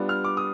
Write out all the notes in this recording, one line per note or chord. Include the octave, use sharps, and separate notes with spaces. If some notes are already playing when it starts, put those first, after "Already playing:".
Already playing: G3 B3 D4 F4
F6
D6
D#6